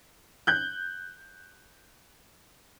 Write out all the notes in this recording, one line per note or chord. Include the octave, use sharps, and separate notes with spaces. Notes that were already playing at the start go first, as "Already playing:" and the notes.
F#6 G6